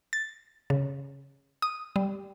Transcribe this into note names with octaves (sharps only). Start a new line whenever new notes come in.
A6
C#3
D#6
G3